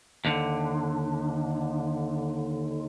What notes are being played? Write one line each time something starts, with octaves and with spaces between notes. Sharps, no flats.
D#2 D3